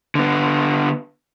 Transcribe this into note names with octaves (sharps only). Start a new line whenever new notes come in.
D3 B3